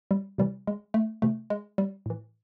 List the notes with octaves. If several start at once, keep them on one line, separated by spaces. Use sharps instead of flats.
G3
C3 E3 G3
G#3
A3
C3 E3 A3
G#3
G3
A2 E3